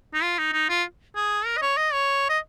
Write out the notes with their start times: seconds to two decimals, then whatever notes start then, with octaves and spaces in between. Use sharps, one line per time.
0.14 D#4
0.22 F4
0.38 D#4
0.53 D#4
0.69 F4
1.16 G#4
1.46 A#4
1.57 D#5
1.62 C#5
1.77 D#5
1.93 C#5
2.29 D#5